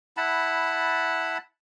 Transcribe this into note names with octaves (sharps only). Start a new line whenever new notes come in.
E4 F#5 A5 B5